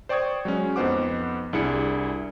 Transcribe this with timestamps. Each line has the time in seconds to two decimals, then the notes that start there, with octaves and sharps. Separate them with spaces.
0.09 C5 D5 G5 C#6 D#6 G#6
0.45 F#3 G#3 C#4
0.76 F2 B3 D#4 C5 F#5 D6
1.53 C2 D4 E4 G#4 C#7